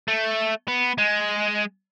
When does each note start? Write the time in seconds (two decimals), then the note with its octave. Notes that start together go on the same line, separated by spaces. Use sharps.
0.08 A3
0.68 B3
0.98 G#3